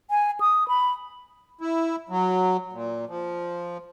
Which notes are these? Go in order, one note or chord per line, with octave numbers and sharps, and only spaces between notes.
G#5
D#6
B5
E4
F#3
A#2
F3